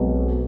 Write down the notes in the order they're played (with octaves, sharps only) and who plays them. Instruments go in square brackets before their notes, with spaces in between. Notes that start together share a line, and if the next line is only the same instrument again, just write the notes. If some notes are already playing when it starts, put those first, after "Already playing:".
Already playing: [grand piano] B1 B2 G#3 C4